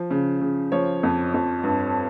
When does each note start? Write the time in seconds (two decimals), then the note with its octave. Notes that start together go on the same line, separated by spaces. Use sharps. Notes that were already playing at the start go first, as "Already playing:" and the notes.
Already playing: F3
0.11 C#3
0.41 C#3
0.72 F3 C#5
1.03 F2
1.34 F2
1.63 G2